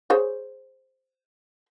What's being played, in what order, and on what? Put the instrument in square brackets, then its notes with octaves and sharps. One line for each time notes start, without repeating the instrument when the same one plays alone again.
[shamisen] G#4 C5 C#5